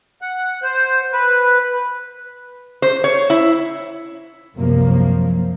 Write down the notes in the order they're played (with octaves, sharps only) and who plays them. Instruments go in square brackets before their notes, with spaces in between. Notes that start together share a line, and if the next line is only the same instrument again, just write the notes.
[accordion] F#5
C5
B4
[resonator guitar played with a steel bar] C5
C#5
E4
[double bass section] C2 C3 A#3 [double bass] F#2 F3